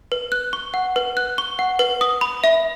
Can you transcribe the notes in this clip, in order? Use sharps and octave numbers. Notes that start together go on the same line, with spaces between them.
B4
F#6
C#6
F#5
B4
F#6
C#6
F#5
B4
D#6
B5
E5